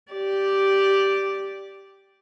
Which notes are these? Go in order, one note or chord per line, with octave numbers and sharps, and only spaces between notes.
G4 D5